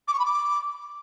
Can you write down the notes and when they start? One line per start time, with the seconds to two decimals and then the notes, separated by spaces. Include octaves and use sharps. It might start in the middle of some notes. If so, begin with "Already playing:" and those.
0.08 D6
0.13 C#6
0.19 B5
0.25 D6